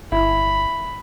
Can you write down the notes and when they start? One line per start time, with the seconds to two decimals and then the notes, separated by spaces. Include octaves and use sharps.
0.12 G1 E4 B5